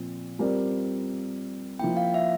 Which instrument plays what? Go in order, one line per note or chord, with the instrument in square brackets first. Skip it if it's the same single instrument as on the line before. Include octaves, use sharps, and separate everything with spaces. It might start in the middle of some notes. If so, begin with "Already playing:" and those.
Already playing: [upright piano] A#2 F3 C4
G3 C4 F4 A#4 D5
[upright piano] F3 A#3 E4 [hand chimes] G5
[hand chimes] F5
E5